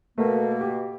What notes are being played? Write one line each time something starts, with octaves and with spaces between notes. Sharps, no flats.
B2 A3 A#3 A#4
G4